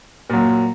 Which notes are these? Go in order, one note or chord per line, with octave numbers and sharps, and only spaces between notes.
A#2 F#3